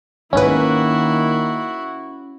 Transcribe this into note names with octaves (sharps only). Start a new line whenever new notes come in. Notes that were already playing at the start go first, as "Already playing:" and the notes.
B1 G#2 D#3 A#3 C#4 E4 F#4 B4